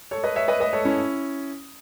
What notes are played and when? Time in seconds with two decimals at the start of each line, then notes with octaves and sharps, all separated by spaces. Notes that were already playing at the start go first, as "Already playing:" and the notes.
0.11 A4 C#5
0.24 B4 D#5
0.36 C#5 E5
0.48 B4 D#5
0.60 B4 D#5
0.73 A4 C#5
0.85 C#4 E4